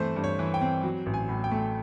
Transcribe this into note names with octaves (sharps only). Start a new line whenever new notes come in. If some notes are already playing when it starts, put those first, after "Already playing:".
Already playing: G2 E3 A3 C4 C5
G2
C#5
E3
G5
C4
F#3
A1
G#5
A2
G5
A3